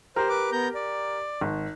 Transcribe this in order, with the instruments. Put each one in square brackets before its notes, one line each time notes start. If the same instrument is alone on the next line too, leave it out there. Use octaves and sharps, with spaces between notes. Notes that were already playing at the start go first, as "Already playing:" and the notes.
[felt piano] G4 A#4 [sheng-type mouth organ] C5
[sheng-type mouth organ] B4 D6
B3 A#5 G6
D5
[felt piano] G#1